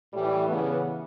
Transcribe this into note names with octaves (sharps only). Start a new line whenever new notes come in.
A2 E3 G3
C#3 E3 B3